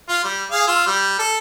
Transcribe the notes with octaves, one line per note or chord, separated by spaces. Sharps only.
F4
G3
G#4 F5
F4 E6
G3
A4